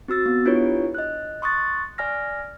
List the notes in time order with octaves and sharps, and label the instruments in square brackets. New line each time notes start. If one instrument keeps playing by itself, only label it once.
[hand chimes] C4 F#4 E6 A6
B3
D4 E4 F4 G4 B4 C#5
D#5 F#6
C6 C#6 D#6 F#6 A6
D5 G#5 F6 A#6